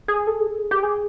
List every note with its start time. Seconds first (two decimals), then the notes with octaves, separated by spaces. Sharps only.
0.08 G#4
0.27 A4
0.40 G#4
0.46 A4
0.58 G#4
0.71 G4
0.83 G#4